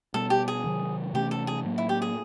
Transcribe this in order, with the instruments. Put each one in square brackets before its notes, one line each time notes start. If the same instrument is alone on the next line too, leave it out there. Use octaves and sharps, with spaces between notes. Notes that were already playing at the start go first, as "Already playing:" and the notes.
[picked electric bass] B2 G3 B3 [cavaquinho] A4
[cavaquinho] G4
G#4
[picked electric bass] C3 D#3 F#3
[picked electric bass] C3 E3 A3 C#4 [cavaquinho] G4
[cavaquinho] A4
G#4
[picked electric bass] A2 F#3 A#3
[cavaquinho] E4
G4
G#4